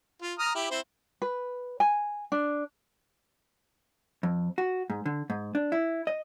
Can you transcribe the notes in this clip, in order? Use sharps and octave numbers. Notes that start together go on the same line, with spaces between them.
F4
A#5 D#6 F6
E4 G4
C4 E4 C5
B4
G#5
D4
F2
F#4
G#2
D3
G#2
D4
E4
D#5